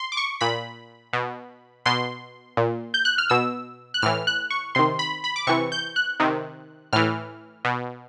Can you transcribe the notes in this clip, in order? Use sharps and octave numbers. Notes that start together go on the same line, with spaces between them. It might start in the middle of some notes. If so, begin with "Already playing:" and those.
Already playing: C6
D6
C#6
A#2 B5
B2
B2 C6
A#2
G6
F#6
F6
B2 E6
F#6
A2 E3 F6
F#6
C#6
C3 D#3 C6
B5
B5
D6
C3 E3 C#6
G6
F#6
C3 D#3
A2 E3 F6
B2